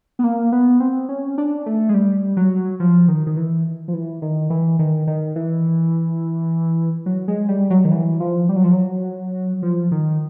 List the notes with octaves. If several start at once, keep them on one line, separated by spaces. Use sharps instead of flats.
B3
A#3
B3
C4
C#4
D4
A3
G#3
G3
F#3
F3
D#3
D#3
E3
F3
E3
D#3
E3
D#3
D#3
E3
F#3
G#3
G3
F#3
D#3
E3
F3
G3
F#3
F3
F#3
F3
D#3